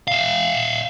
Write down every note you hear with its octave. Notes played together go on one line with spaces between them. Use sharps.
E5 F5